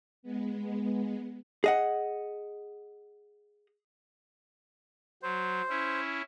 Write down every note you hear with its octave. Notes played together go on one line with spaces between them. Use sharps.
G#3 B3
G#4 D#5 F#5
F#3 C5
C#4 E4